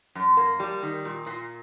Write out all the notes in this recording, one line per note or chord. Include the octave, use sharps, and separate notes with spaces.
F#2
A#3
G3
D#3
A#2
A#2